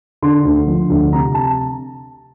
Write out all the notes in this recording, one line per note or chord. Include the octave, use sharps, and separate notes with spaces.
D3 C6
D2
F3
D2
C3 A#5
A5